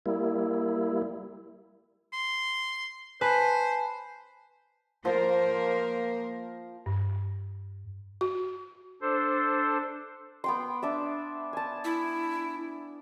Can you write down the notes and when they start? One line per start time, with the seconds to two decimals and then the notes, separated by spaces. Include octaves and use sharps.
0.06 G3 A#3 E4
2.12 C6
3.21 B4 C5 G#5 A5
5.05 F3 A#3 A#4 C5
6.86 G2
8.21 F#4
9.02 D4 A4 C5
10.44 B3 G5 C6
10.82 D4 D5 E5
11.53 G#5 A5
11.84 E4